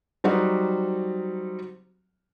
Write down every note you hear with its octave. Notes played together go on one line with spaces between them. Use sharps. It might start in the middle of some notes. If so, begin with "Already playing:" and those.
F#3 G3 C4 D#4 F#4